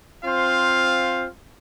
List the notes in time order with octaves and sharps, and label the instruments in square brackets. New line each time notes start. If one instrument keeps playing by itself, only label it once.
[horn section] C4 F4 C5 F5